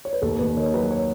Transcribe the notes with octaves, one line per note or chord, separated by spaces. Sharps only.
C#5
B4
D#2 A4
D#2 B4
D#3 C#5
F#3 B4
C#5